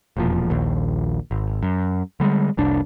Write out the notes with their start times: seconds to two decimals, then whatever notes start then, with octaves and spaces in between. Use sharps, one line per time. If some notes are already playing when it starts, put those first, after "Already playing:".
0.17 E1 F2 A#2 F3
0.50 A#1 D#2
1.31 G#1
1.63 F#2
2.20 D3 G3 G#3
2.57 F1 C2 D4